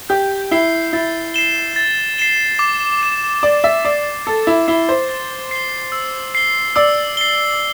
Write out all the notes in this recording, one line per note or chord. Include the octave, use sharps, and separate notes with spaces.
G4 G6
E4 C7 G7
E4 A6
C7 E7 G7
A6
C7 E7 G7
D6
C7 E7
D5 D6
E5
D5 C7 E7
A4 A6
E4
E4 C7 G7
C5
A6
C7 G7
E6
C7 G7
D5 E6
C7 G7